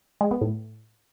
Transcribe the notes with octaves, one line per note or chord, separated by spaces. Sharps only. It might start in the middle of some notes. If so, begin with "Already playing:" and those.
G#3
B3
A2